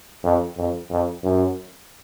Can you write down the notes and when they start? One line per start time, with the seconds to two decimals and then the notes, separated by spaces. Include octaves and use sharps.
0.24 F2
0.57 F2
0.90 F2
1.23 F#2